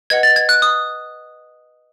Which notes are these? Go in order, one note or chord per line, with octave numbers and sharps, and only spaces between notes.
B4 D#5 F#5 G#6
A6
G#6
F#6
D#6